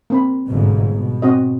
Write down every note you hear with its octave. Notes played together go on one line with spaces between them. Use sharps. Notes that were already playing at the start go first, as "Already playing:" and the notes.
A#3 C4 B5
G1 G#2 B2
B2
C4 F#4 D#5